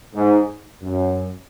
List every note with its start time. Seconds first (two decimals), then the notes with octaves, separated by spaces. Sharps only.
0.15 G#2
0.83 F#2